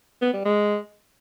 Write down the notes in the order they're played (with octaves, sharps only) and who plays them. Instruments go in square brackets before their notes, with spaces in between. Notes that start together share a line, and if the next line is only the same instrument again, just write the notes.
[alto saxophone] B3
G3
G#3